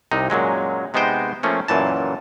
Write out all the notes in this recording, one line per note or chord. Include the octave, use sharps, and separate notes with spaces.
C2 C3 D#4
F#2 A#2 F#3 G#3
C3 G#3 B3 D#4 C5 G5
F3 A3 A#3 C#4
F#2 A#2 E3 A5